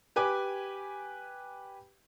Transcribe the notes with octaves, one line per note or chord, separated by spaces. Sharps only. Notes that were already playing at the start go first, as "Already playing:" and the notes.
G4 B4 G#5 D6